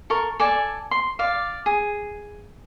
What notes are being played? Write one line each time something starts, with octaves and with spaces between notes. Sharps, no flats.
A4 A#4 C#6
A4 D5 G#5 A5
C6
D5 F5
G#4